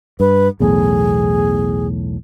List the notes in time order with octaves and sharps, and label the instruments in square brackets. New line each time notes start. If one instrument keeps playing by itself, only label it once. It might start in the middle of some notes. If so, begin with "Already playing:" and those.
[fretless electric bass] G2 [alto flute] B4
[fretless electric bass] B1 E2 A2 [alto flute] G#4